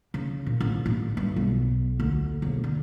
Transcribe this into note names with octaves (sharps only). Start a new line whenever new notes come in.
C#3
A#2
A1
A1
G2
B1
D2
E1
D3